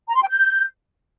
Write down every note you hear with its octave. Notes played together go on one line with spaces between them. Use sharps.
A#5
C6
G5
G6